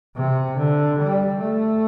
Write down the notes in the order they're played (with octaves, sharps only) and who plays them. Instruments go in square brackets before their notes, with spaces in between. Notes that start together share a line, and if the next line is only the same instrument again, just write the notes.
[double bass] C3
D3
G3
A3